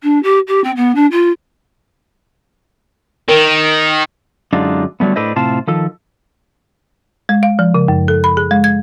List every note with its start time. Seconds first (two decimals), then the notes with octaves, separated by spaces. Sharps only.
0.03 D4
0.23 G4
0.47 G4
0.64 C4
0.76 B3
0.95 D4
1.11 F4
3.28 D#3 A#4
4.53 F#2 D3 G#3 D4 D#4 F4
5.00 D3 F#3 G3 A3 B3
5.16 A2 D4 A4 B4 C5 D#5
5.36 A2 C3 F4 C5 A5
5.67 D#3 F3 A4
7.29 G#3
7.43 F5
7.59 F3
7.74 C#3
7.88 F#2
8.08 A4
8.24 B5
8.37 G#4
8.51 G#3
8.64 G#6